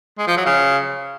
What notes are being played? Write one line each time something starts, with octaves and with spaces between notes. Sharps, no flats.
G#3
F3
F#3
C#3